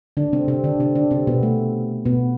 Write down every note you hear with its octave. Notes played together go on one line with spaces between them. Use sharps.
D3 D4
C3 C4
C3 C4
D3 D4
C3 C4
D3 D4
C3 C4
B2 B3
A3
B2 B3